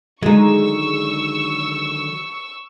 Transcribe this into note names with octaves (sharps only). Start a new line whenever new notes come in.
D3 D#3 F#3 G#3 D#4 C#6 E6